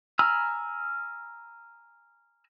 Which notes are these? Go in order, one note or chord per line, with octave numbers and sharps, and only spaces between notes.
G#5 A#5 B5 E6 F6